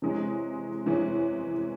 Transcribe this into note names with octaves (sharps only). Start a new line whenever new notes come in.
C3 E3 G#3 C#4
C3 E3 G#3 C#4